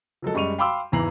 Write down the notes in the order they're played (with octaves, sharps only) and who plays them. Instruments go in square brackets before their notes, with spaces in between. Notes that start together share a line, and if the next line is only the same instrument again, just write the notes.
[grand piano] F3 F#3 G#3 A4
F#2 G3 G#3 C#6 D#7 F7
F5 G5 B5 C6 D6 E6
G#1 E2 E3 A#5 C7 F#7